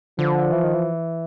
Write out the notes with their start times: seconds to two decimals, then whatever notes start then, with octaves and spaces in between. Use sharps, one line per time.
0.19 D3 F3
0.52 E3
0.64 D#3
0.74 E3